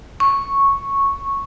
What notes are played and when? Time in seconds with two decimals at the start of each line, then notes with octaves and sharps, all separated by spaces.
0.20 C#6